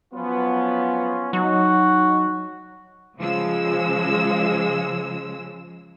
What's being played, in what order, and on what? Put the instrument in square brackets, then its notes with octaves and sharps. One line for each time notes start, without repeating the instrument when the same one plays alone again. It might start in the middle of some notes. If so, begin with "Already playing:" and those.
[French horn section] F3 F#3 B3 [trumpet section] C#4 F4
[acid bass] F#3 [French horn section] D#4 [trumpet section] F#4
[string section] C#3 F3 G#3 E6